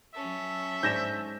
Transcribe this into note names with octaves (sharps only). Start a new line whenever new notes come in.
F#3 C#4 A4 E5
G#2 D5 G6 A#6 E7